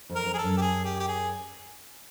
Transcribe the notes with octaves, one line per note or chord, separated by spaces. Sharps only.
F2
A#4
F2
G#4
A4
F#2
G4
G#4
G4
G4
G#4